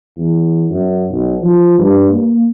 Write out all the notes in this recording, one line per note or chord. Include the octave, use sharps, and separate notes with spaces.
E2
F#2
B1
F3
G2
A#3